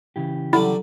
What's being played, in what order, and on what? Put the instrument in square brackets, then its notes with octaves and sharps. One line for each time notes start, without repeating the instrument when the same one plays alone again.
[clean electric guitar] C#3 E3 G4
[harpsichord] D3 F#3 G3 [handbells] E4